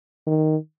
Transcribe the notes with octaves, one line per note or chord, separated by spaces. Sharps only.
D#3